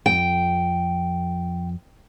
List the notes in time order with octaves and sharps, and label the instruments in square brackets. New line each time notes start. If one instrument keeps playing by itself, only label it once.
[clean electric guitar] C2 F2 [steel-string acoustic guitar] G5